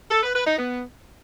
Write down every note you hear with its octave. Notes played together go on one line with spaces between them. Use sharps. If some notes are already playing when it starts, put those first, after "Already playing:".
A4
B4
B4
D#4
B3